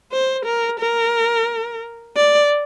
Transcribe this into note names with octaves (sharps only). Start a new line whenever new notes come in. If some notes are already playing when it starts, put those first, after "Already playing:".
C5
A#4
A#4
D5